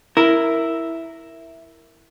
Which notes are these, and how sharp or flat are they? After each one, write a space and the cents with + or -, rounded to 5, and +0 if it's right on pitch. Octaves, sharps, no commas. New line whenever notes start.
E4 +0 A#4 -5